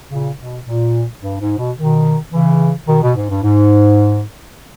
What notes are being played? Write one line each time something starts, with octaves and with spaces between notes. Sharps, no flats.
A#2 C#3
B2
A#2
G2
G#2
B2
B2 D#3
C#3 E3
B2 D#3
B2
G#2
G2
G#2